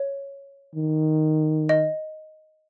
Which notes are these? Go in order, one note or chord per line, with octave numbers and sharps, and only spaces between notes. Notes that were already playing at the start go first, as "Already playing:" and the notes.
Already playing: C#5
D#3
D#5